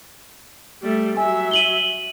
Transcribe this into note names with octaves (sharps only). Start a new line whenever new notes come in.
G3 A3
F#3 E5 G#5
D#7 F#7 G7